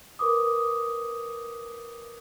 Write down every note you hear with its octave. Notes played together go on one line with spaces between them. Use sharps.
A#4 B4 D6 D#6